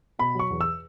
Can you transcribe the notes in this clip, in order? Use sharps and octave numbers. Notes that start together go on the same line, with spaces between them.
B2 B5
F#3 C#6
E2
E6